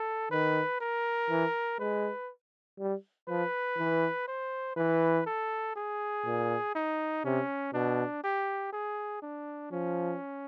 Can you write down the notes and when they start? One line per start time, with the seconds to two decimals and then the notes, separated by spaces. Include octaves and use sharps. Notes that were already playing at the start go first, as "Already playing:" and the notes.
Already playing: A4
0.31 D#3 B4
0.81 A#4
1.30 E3
1.79 G#3 B4
2.79 G3
3.28 F3 B4
3.78 E3
4.28 C5
4.76 E3 B4
5.26 A4
5.76 G#4
6.26 A#2
6.75 D#4
7.25 C3 C#4
7.74 B2 D4
8.24 G4
8.73 G#4
9.22 D4
9.72 F3 C#4